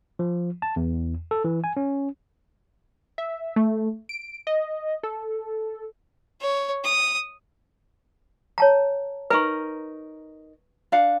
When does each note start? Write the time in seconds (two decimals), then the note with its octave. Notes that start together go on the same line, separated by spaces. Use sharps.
0.19 F3
0.62 A5
0.76 E2
1.31 A4
1.44 E3
1.64 G#5
1.77 C#4
3.18 E5
3.56 A3
4.09 D7
4.47 D#5
5.03 A4
6.41 C#5
6.84 D#6
8.58 C#5 A5 A#5
9.30 D#4 A#4 B4 C#6
10.92 D4 F5 F#5